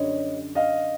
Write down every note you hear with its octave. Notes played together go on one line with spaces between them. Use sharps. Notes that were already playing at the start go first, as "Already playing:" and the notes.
Already playing: F#2 D3 G3 C#5 D#5
D#5 F5